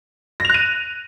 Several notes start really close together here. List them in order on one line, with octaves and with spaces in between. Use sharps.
A#6 F7 F#6 D#7